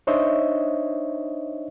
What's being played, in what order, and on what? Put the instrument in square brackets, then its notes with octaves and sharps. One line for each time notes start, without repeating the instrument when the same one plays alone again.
[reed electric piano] D4 D#4 C5 C#5 D#5 E5